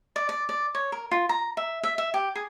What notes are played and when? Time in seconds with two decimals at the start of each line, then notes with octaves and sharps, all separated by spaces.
0.16 D5
0.29 D5
0.49 D5
0.75 C#5
0.92 A#4
1.11 F4
1.29 A#5
1.57 E5
1.84 E5
1.98 E5
2.14 G4
2.36 G#4